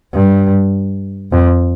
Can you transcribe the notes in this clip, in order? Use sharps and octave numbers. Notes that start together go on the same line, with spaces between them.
G2
F2